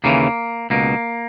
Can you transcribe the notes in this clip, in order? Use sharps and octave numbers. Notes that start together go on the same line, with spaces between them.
D#2 C#3 E3 A#3
C#2 B2 A#3